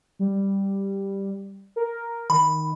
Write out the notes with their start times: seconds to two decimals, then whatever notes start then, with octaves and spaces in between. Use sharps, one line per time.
0.19 G3
1.76 A#4
2.30 D#3 B5